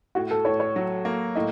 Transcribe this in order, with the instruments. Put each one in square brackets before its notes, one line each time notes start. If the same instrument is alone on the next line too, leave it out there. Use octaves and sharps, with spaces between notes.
[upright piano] A2 [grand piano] F#4
[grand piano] A4
[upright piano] A2 [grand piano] C#5
[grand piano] C#5
[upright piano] F#3
A#3
[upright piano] A2 [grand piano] D#5